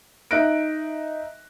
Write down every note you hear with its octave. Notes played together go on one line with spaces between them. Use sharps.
D#4 E5 F#6 A#6 D7